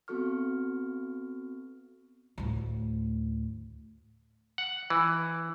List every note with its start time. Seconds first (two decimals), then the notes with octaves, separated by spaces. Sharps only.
0.08 B3 C4 F#4 A4 C#6 F6
2.38 D2 A2
4.58 F#5
4.90 E3